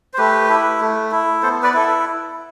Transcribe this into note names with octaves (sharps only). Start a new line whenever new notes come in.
C5
A3 G4 B4
E4
A3
E4
B3 A4 C5
B4 D5
E4 A4